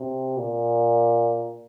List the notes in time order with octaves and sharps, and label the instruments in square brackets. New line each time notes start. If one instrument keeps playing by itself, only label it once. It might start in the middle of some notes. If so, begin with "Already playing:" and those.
Already playing: [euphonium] C3
A#2